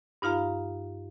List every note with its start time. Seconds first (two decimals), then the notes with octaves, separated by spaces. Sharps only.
0.22 G2 D#4 F4 F5 A#5